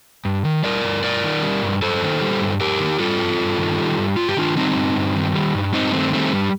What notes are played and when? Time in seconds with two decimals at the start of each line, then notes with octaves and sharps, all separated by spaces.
0.25 G2
0.45 D#3
0.64 G3 A#4 D5
0.84 G2
1.04 G2 A#4 D5
1.24 D#3
1.42 G3
1.63 G2
1.82 G2 A4 C5
2.02 D#3
2.21 G3
2.41 G2
2.60 G2 G4 A#4
2.80 D#3
2.99 G3 F4 A4
3.19 G2
3.39 G2
3.58 D#3
3.78 G3
3.98 G2
4.17 G2 F4
4.28 G4
4.37 D#3 D4 F4
4.57 G3 C4 D#4
4.76 G2
4.96 G2
5.16 D#3
5.34 G3
5.54 G2
5.74 G2 C4 D#4
5.93 D#3 A3 C4
6.13 G3 A3 C4
6.32 G2